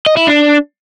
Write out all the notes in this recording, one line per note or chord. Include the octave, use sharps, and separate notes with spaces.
D#5
E4
D4